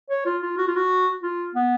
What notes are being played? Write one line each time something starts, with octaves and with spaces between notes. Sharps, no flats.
C#5
F4
F4
F#4
F4
F#4
F4
B3